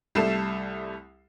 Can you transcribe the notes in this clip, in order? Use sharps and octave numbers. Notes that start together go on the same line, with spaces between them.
C2 G3 A3 A4 C7 E7